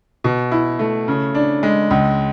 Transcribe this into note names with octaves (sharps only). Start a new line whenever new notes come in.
B2
E4
A3
C#3
D4
G#3
C#2